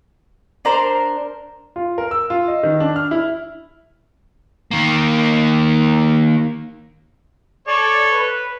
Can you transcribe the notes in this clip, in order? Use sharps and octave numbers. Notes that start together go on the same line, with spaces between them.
D4 A#4 C5
F4
A#4
E6
F4
D#5
D#3
D4
F6
E4
D#3 A#3
A4 C#5 D5
B4